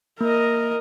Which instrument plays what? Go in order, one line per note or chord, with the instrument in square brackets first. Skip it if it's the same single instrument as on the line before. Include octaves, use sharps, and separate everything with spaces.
[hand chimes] A#3 [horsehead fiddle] A#4 D#5